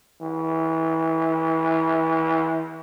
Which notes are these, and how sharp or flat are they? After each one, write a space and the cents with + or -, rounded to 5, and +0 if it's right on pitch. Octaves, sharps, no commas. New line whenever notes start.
E3 -25